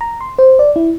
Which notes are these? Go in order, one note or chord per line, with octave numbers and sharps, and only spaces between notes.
A#5
C6
C5
D5
E4